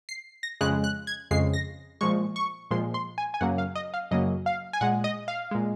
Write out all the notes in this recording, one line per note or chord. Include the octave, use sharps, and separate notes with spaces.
C7
A#6
F2 C#3 G#3 F#6
F#6
G#6
F2 C#3 G#3 C7
A#6
A#2 F3 G#3 C#6
C#6
A#2 F3 G#3 C6
C6
G#5
G#5
F#2 C#3 F#3 A#3 F#5
F5
D#5
F5
F#2 C#3 F#3 A#3 D#5
F5
G#5
A#2 G#3 F#5
D#5
F5
A#2 G#3